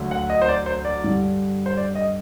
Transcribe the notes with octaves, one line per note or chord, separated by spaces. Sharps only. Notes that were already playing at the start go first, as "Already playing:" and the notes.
Already playing: D2 D3 F#3 A3
F#5
D#5
C5
D5
C5
D5
G2 D3 G3
C5
D5
D#5